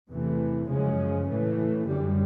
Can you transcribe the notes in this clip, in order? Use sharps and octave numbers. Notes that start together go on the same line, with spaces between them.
E2 C3 E3 A3
F#2 C#3 F3 G#3 C#4
A2 E3 A3
F#2 D3 G3